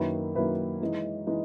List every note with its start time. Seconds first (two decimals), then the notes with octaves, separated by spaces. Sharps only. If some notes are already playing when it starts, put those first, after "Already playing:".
Already playing: F#2 D#3 A#3 E4 B4
0.35 F#2 D#3 A#3 E4 B4
0.81 E3 G#3 D#4
1.27 E3 G#3 D#4